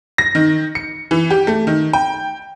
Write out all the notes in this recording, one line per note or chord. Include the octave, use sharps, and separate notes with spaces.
A#6
D#3
C#7
E3
G4
A3
D#3
G5